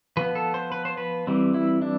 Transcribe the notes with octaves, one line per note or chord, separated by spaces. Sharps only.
F3 B3 B4
A4
C5
B4
C5
B4
E3 G3 C4
E4
D4